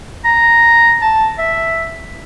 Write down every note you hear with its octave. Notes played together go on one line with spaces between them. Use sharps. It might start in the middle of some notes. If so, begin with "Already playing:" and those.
A#5
A5
E5